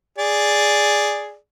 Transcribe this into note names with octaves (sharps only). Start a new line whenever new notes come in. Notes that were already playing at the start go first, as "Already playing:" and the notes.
G#4 D5